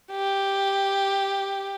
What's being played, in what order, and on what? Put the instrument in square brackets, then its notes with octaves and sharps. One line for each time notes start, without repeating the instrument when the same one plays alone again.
[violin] G4